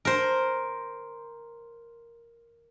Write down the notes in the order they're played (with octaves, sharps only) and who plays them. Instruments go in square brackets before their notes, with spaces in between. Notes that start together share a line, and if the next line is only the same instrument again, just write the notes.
[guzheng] A#4 C5